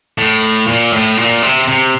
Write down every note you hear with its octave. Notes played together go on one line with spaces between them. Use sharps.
A2
A#2
A2
A#2
C3
C3